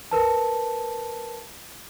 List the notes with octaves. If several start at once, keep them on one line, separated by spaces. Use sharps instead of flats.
A#4 B4 A5